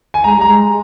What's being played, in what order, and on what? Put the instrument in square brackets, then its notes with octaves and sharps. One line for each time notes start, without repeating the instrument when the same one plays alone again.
[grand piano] G#5
[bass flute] G#3 [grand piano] A#5
[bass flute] G3
[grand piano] A#5
[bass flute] G#3